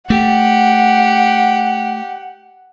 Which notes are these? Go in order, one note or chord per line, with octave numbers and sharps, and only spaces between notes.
A3 G4 F#5